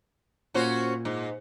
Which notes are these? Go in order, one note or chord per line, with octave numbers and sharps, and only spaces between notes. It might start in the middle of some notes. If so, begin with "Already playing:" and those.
A#2 C#4 F#4 C5
G#2